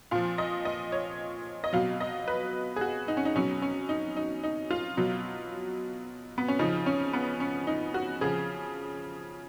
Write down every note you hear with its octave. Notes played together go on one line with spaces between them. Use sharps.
A#2 F3 F5
D#5
D#5
C#5
D#5
B2 F#3 F5
D#5
B4
G#4
F#4
D#4
C#4
D#4
B2 F#3 C#4
C#4
D#4
D#4
D#4
F4
B2 F#3
B3
C#4
C#3 F3 D#4
C#4
B3
C#4
D#4
F#4
C#3 F3 G#4